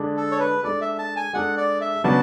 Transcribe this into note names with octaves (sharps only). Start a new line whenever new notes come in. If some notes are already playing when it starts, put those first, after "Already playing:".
Already playing: D3 G#3 D4
A4
C#5
B4
G#3 D4 A4 D5
E5
A5
G#5
G#3 D4 A4 F#5
D5
E5
C#3 F#3 B3 D4 F#4 A5